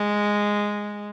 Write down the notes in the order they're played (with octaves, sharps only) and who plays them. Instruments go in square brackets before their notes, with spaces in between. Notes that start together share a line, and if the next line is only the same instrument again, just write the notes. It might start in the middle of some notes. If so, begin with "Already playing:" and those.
Already playing: [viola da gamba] G#3